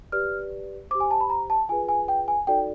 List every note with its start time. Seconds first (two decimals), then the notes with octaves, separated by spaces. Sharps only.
0.12 G4 B4 D5 F6
0.91 C5 D6
0.95 G4
1.00 G#5
1.11 A5
1.21 B5
1.30 A#5
1.50 A5
1.69 F4 G#4 B4 G#5
1.89 G#5
2.08 G5
2.28 G#5
2.47 D#4 F#4 A4 D5 G5